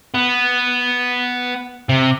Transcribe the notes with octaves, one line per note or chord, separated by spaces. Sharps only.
B3
C3